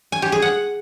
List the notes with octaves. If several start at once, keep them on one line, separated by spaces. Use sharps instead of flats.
G#5
G4
G#4
F#5